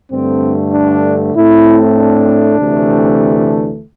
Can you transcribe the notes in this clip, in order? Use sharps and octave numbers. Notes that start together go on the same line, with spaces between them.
G2 D3 A3 C4
D4
A2 A3 C4 E4
D4
D2 C3 E3 A3